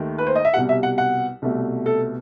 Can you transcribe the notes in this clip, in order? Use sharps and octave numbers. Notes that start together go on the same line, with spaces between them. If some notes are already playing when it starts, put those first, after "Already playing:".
Already playing: D#2 D#3 A3
B4
C5
D#5
E5
C2 B2 G3 F#5
E5
F#5
F#5
C2 B2 A3
A4